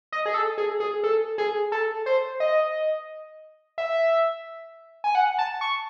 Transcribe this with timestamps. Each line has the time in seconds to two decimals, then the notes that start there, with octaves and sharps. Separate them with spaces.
0.12 D#5
0.26 G#4
0.34 A4
0.58 G#4
0.80 G#4
1.04 A4
1.38 G#4
1.72 A4
2.06 C5
2.40 D#5
3.78 E5
5.04 G#5
5.15 F#5
5.38 A5
5.61 C#6